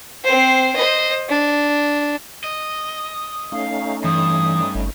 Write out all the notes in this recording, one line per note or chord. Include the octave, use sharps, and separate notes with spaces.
C4 C5
C5 D#5
D4
D#5
A3 C#4 D#4 F5
G2 E3 D#6
G1